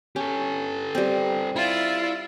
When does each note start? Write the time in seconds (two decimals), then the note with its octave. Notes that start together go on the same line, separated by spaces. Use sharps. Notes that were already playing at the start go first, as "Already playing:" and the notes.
0.16 C#4 G4 A4
0.95 G3 C4
1.56 E4 F4 D5